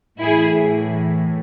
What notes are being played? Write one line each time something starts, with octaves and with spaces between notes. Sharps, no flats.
A2 E3 E4 G#4